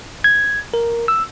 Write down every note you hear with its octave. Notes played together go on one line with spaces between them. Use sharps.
G#6
A#4
E6